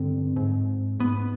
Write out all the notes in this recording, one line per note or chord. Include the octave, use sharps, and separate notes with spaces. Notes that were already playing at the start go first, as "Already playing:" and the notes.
Already playing: G2 D3 C4
G#2
G#2 B3